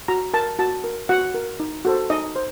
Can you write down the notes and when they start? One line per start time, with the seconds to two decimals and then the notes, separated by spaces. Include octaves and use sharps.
0.08 F#4 A#5
0.34 A#4 A5
0.59 F#4 A5
0.84 A#4
1.09 F#4 F#5
1.34 A#4
1.60 D#4
1.85 F#4 A4 C5
2.10 D#4 D#5
2.36 C5